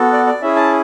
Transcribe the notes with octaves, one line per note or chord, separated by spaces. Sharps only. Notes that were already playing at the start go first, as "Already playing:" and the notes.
Already playing: B3 F#4 A4
D5
D5
C#4 E4 G#4 E5
A5